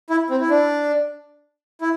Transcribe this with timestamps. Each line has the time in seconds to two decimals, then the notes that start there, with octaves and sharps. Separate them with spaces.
0.10 E4
0.30 C4
0.41 E4
0.50 D4
1.81 E4